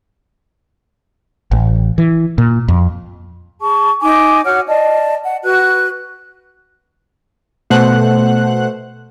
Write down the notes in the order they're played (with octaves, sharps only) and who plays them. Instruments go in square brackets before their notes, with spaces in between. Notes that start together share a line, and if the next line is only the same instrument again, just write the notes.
[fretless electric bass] A1
E3
A#2
F2
[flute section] G#4 A5 C#6
D#4 G#5 D6
F#4 C#5 F#5 F6
D5 D#5 A5
F#5
F#4 B4 F#6
[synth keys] B2 A3 C5 F#5 F#6